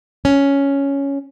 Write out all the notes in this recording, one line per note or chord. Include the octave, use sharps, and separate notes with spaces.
C#4